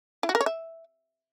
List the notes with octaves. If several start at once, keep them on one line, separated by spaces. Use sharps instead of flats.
E4
F#4
A#4
C#5
E5